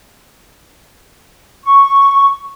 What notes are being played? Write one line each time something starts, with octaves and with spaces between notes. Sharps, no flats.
C#6